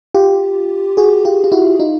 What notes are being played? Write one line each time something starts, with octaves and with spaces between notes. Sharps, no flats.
F4 G4
F#4 G#4
F4 G4
F4
E4 F#4
D#4 F4